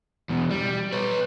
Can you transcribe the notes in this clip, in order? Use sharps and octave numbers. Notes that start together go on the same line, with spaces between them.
E2 B2
G3
B4 C#5